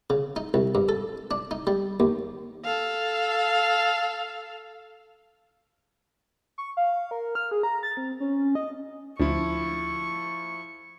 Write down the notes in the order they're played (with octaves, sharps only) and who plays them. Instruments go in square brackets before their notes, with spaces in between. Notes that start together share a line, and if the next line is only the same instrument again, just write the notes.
[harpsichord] C#3
D#4
C2
G2
A4
D4
D#4
G3
D#2
[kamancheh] A4 F5
[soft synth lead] C#6
F5
A#4
F6
G#4
A#5
A6
C4
C#4
D#5
[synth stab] D2 [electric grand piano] F3 E4 [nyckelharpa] C#6